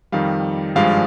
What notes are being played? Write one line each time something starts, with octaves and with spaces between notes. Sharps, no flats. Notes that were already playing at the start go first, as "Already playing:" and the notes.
F2 D#3 G3 F5
G#1 G2 F3 G#3 F5